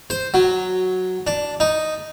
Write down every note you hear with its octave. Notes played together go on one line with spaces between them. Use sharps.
C5
F#3
D4
D#4